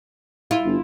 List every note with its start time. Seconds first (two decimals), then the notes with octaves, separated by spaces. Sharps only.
0.51 E4 F4
0.66 G1